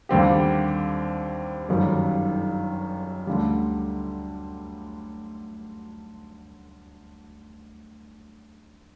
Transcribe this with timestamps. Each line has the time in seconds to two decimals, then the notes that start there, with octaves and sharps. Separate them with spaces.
0.09 D#2 D3 G3 C4 G4
1.69 G1 F#2 D#3 G3
3.27 D2 D3 G3